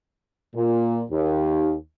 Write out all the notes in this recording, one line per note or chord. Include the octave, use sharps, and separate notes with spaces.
A#2
D#2